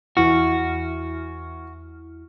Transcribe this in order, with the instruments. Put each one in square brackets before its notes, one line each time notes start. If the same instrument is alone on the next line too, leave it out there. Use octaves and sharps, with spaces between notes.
[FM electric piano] E2 E4 F6 [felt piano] E3 [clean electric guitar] F#4